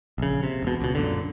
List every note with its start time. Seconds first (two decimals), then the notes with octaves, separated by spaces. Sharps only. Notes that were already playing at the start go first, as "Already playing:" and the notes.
0.18 A#1 C#3
0.43 C3
0.63 E1 B2
0.80 C#2 B2
0.95 F#2 A#2 D3